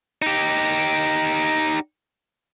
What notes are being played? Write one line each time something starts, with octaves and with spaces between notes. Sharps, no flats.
D#4 G4